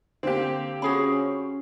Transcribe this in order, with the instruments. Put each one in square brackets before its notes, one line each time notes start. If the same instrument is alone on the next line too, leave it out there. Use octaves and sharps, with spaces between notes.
[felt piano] D3 A#3 [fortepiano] C4 G4
[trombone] C#4 [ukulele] F#4 G#4 B5